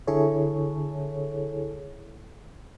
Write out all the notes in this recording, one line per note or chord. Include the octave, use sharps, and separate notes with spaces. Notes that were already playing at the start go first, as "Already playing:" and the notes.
D3 E4 G#4 A4 C#5